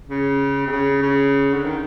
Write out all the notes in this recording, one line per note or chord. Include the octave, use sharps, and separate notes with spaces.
C#3
C3
C#3
C#3
D3
D#3